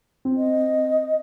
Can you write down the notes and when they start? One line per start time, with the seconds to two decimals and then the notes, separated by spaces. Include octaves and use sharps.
0.25 C4
0.37 D#5